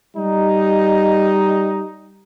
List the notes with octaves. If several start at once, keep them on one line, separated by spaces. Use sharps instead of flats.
G3 D#4